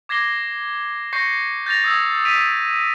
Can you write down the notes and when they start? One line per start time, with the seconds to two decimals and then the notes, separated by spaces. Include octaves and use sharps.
0.09 D6 G#6 A#6 C7 G7
1.13 C#6 G6 A#6 C7 C#7
1.66 G6 A6 A#6 F7
1.84 D#6 E6 G#6 F7
2.25 B6 D7 D#7 F7